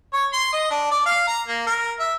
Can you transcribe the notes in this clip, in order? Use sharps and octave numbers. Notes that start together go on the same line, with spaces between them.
C#5
C6
D#5
D4
D5
F5
A#5
A#3
A#4
E5